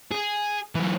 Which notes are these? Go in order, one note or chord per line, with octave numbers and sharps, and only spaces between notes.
G#4
E3 F#3